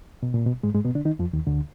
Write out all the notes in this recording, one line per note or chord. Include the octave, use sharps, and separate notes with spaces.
B2
A#2
B2
G#2 G#3
G#2 G#3
B2 B3
D3 D4
D#3 D#4
F2 F3
D#2 D#3
D2 D3